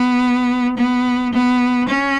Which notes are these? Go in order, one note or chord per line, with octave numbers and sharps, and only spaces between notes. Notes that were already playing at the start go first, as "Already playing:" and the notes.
Already playing: B3
B3
B3
C#4